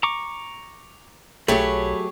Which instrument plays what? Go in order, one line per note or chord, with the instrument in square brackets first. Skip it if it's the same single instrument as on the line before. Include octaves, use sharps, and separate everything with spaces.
[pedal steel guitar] A#5 C#6 D6
[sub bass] B1 [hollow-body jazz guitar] F#3 A3 [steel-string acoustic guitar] G4 G#4 C#5 [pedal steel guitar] B5